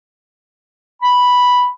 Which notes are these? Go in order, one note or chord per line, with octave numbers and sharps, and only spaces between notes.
B5